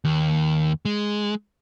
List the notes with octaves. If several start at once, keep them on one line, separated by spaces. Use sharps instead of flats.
D#2
G#3